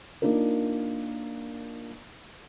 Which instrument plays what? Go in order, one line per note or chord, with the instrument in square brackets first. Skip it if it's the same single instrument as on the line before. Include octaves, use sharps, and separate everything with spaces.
[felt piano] A#3 D4 D#4 F4 A#4